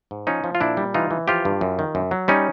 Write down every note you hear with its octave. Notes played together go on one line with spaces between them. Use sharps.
G#2
F3 C#4 D#4
F3
F4
A#2 D4 E4
G3
E3 D#4 F4
E3
F3 F4 G4
G2
F#2
D#3
F#2
F#3
G3 C#4 D#4